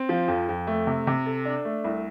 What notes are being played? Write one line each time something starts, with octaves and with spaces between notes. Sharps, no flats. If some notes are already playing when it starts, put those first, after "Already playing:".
Already playing: C4
F3
F2
F2
A3
C3
C3
A4
D4
A3
C2